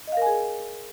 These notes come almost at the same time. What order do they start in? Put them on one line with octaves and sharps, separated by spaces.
D#5 F5 A#4 G#5 G#4